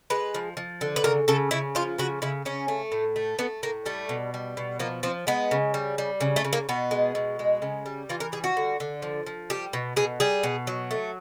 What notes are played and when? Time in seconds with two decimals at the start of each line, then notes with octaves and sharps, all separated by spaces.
0.10 G#3 B4
0.35 F3
0.57 F3
0.81 D3
0.96 B4
1.04 C#3 A#4
1.28 C#3 A4
1.51 C#3 E4
1.75 F3 F4
1.98 C#3 F#4
2.22 C#3 E4
2.45 C#3 C#4
2.68 A3
2.92 A2
3.16 A3
3.39 A3 B3
3.63 A2 A#3
3.86 G3 A3
4.09 B2
4.34 G3
4.57 B2
4.79 F3 A#3
5.03 F3 C4
5.27 G#3 B3
5.51 C#3
5.74 G3
5.98 G3
6.21 C#3
6.36 A3
6.44 C#3
6.53 A#3
6.69 B2 B3
6.91 G#3
7.15 B2
7.39 G#3
7.62 C#3
7.86 G3
8.09 E3 F4
8.20 A#4
8.32 G3 G#4
8.44 F#4
8.57 D3
8.80 D3
9.02 F3
9.27 F3
9.50 G3 G4
9.73 B2
9.96 B2 G#4
10.20 G3 G#4
10.43 B2
10.67 F#3
10.91 A3